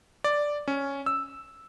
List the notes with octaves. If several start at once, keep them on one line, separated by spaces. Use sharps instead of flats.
D5
C#4
E6